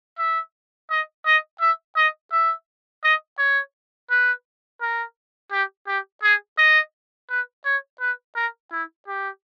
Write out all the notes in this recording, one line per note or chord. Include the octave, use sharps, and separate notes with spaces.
E5
D#5
D#5
E5
D#5
E5
D#5
C#5
B4
A#4
G4
G4
G#4
D#5
B4
C#5
B4
A#4
E4
G4